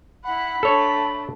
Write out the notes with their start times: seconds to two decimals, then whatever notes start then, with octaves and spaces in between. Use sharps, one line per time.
0.24 E4 F#5 B5
0.63 A3 D4 A4 C#5